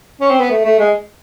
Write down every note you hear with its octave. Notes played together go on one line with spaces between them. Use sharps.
C#4
C4
B3
A3
A3
G#3